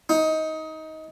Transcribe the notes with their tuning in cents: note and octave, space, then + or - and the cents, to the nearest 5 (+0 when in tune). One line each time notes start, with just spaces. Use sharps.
D#4 +20